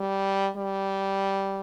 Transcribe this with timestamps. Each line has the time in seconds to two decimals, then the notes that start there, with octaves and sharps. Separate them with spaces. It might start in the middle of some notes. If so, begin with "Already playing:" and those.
Already playing: G3
0.56 G3